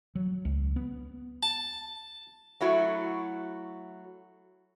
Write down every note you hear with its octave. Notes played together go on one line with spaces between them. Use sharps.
F#3
C#2
B3
A5
F#3 A3 E4 F#4